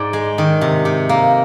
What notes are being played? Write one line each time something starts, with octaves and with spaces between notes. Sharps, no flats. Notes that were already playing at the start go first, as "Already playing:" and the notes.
Already playing: G#2 D5
G#3
D#3
C3
C3
A#3